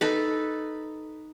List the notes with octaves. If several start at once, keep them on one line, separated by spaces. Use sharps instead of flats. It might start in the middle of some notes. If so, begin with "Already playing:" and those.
D#4 A4 B4